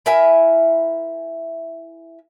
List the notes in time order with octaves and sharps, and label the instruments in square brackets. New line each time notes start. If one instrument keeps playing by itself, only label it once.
[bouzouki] E4 A#4 E5 G#5